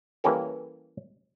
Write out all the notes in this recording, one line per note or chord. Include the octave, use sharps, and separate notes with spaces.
E3 G3 A#3 C#4 G4 A4